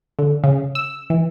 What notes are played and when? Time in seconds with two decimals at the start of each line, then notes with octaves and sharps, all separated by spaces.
0.19 D3
0.44 C#3
0.75 E6
1.10 E3